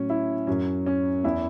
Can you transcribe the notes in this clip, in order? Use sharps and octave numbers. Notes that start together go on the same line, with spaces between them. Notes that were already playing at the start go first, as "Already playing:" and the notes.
Already playing: A2 F#3 C#4
E4
F#2 F#3 C#4
C#4
E2 E3 E4